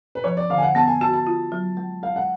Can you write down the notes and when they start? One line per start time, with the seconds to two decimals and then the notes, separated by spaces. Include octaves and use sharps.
0.15 B4
0.24 F3 C#5
0.37 D5
0.50 D3 F5
0.58 G#5
0.62 F#5
0.75 B3 A5
0.88 G#5
1.01 F#4 A5
1.13 A5
1.27 F4
1.52 F#3
1.77 G#3
2.03 G#3 F5
2.16 F#5